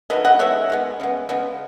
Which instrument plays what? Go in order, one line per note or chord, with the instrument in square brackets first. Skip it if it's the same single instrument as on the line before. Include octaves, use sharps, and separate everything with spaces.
[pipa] D#3 F#3 A3 B4 D#5
D#5 F#5
D#3 G#3 B3 C#5 E5
D#3 G#3 B3
C#3 G#3 B3
C#3 G#3 B3